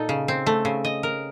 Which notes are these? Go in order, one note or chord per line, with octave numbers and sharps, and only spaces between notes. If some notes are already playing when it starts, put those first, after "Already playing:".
Already playing: A#2 D#4 A4
C#3
C4
A3
C#3
D#5
A#4